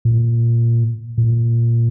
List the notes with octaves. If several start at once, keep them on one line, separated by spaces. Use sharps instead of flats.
A#2
A#2